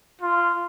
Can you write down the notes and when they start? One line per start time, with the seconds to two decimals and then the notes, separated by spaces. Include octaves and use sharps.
0.22 F4